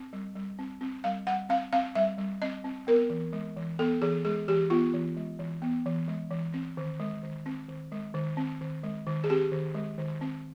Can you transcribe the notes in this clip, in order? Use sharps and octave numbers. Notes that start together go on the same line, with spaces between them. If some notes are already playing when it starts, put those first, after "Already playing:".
Already playing: C4
G3
G3
C4
C4
G3 F5
G3 F#5
C4 F5
C4 F5
G3 E5
G3
C4 D#5
C4
B3 A#4
E3
G#3
E3
B3 A4
E3 G#4
G#3 G#4
E3 G4
B3 F4
E3
G#3
E3
B3
E3
G#3
E3
C4
D#3
G#3
D#3
C4
D#3
G#3
D#3
C4
D#3
G#3
D#3
G#4
C4 G4
D#3
G#3
D#3
C4